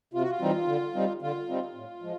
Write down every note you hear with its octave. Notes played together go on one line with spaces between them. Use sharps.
C3 F4
F#4
F4
E3 G3 C4 D#4
D3
G3 C4 D#4
D3 F4
G3 C4 D#4
A2
F3 G#3